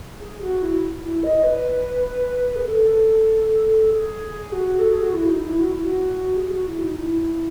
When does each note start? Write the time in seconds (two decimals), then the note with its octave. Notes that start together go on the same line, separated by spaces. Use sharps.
0.20 G#4
0.41 F#4
0.61 E4
1.03 E4
1.23 D#5
1.43 B4
2.55 G#4
2.67 A4
3.90 G#4
4.52 F#4
4.79 A4
4.90 G#4
5.02 F#4
5.13 E4
5.29 D#4
5.44 E4
5.59 F#4
5.72 E4
5.85 F#4
6.36 G#4
6.52 F#4
6.67 E4
6.82 D#4
6.97 E4